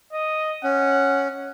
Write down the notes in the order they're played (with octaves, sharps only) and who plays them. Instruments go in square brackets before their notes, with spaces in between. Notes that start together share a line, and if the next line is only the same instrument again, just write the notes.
[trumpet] D#5
[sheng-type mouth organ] C#4 [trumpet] F#5